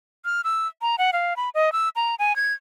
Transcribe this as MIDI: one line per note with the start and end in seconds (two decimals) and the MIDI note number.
0.25 0.41 89
0.44 0.68 88
0.82 0.96 82
0.98 1.11 78
1.13 1.36 77
1.36 1.49 83
1.55 1.72 75
1.72 1.89 88
1.96 2.15 82
2.19 2.35 80
2.36 2.53 92